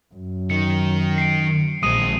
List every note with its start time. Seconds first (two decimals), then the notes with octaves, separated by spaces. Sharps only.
0.14 F#2
0.50 D#3 C#7
1.18 C7 D7
1.83 A#1 G#3 C4 D#6 D#7